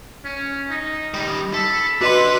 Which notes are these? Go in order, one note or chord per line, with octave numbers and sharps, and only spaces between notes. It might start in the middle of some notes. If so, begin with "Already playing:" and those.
C#4
D#4
D#3 G3
A4 B5
D4 F#4 B4 D#5 F#5 C6